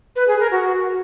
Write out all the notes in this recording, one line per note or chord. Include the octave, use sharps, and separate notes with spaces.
B4
G#4
A#4
F#4